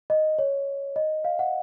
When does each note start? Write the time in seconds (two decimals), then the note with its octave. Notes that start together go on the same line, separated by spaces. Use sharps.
0.10 D#5
0.39 C#5
0.96 D#5
1.25 F5
1.39 F#5